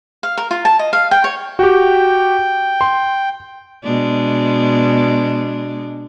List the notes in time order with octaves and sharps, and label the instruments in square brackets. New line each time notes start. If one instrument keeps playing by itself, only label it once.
[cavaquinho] F5
A#4
F4
A5
D#5
F5
G5
C#5
[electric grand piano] F#4 G4 [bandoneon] G5
[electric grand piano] C6
[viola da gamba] B2 G#3 D4